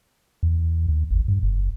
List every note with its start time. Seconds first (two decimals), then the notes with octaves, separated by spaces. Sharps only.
0.43 E2
0.89 D#2
1.11 G1
1.28 G2
1.43 F#1